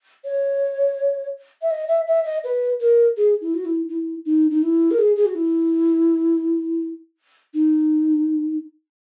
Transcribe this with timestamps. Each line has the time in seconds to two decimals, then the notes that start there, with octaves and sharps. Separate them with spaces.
0.24 C#5
1.62 E5
1.71 D#5
1.88 E5
2.07 E5
2.24 D#5
2.44 B4
2.80 A#4
3.17 G#4
3.41 E4
3.54 F#4
3.65 E4
3.89 E4
4.26 D#4
4.50 D#4
4.62 E4
4.91 A#4
4.98 G#4
5.16 G#4
5.25 F#4
5.35 E4
7.54 D#4